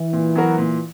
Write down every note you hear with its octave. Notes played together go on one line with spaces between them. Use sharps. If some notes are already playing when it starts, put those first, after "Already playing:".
Already playing: E3
A#2
F#3 B3 F#4 A#4
A#2